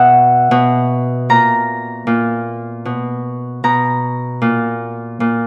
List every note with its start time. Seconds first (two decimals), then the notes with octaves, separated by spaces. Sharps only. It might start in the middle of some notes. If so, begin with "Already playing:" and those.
Already playing: B2 E5 F#5
0.51 B2
1.29 A#2 A#5
2.07 A#2
2.85 B2
3.64 B2 A#5
4.42 A#2
5.20 A#2